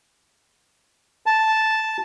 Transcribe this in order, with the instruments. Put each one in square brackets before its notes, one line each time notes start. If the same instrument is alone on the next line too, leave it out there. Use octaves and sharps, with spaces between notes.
[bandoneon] A5